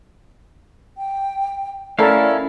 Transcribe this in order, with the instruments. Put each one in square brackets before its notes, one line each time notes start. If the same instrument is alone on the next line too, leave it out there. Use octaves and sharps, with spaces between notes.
[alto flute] G5
[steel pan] A3 A4 A#4 [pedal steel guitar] C#4 E4 F5 [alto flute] D5